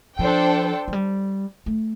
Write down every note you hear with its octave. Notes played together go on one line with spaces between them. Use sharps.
F3 D4 A4 C5 G5
F3
G3
A3